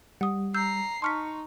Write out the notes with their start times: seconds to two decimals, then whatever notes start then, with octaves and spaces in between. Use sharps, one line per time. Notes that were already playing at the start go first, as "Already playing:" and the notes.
0.21 G3 F#5 D#6
0.54 A#5 E6 G6 C7
1.02 D#4 A5 C6 C#6 F6 B6